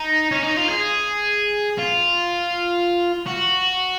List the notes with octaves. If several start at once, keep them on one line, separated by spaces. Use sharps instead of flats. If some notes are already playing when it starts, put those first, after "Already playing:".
Already playing: D#4
C#4
D#4
F4
G#4
F4
F#4